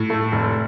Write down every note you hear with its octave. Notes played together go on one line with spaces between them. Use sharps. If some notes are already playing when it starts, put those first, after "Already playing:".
Already playing: A2
A3
F1